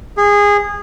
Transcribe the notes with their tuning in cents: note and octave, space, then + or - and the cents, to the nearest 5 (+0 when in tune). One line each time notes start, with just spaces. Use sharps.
G#4 -20